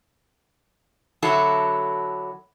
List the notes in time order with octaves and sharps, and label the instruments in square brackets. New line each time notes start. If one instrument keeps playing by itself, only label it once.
[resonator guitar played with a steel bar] D3 F#3 E4 F#4 A4